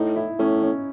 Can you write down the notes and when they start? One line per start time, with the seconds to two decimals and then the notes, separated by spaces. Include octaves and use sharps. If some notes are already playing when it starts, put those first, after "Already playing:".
Already playing: A2 D#4
0.16 E4
0.39 A2 C#4
0.62 C#4